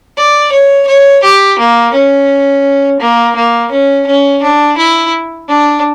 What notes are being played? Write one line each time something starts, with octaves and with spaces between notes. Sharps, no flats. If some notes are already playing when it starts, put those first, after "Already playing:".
D5
C#5
C#5
G4
A#3
C#4
A#3
A#3
C#4
C#4
D4
E4
D4